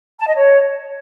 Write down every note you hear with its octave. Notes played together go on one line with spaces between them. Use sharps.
A5
D#5
C#5